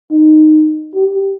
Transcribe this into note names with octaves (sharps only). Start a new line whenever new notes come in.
D#4
G4